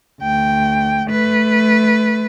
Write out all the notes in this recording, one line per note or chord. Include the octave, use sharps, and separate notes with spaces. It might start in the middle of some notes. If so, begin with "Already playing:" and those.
D2 G5
A3 B4